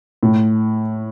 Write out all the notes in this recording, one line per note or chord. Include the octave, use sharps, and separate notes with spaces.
A2